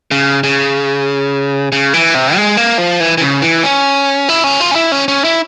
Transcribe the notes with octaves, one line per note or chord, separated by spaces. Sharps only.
C#3
C#3
C#3
E3
C3
G#3
A#3
F3
E3
E3
C#3
E3
C#4
E4
C#4
F4
C#4
E4
C#4
C#4
E4